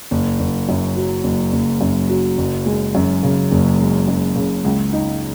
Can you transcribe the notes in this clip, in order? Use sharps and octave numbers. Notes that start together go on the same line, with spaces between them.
F#1
F#1
F#2
F#3
F#1
F#1
F#2
F#3
F#1
G#3
F#2
C#3
F#1
G#3
F#2
C#3
C#2
D#4